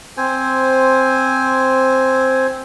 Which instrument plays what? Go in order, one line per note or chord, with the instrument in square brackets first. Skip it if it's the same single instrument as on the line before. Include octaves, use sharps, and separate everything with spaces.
[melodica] C4 C5 G#5